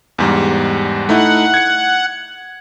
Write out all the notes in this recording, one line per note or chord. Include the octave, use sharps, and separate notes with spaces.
E2 G#2 G3
A3 D#4 E4 F#5
G#6 C#7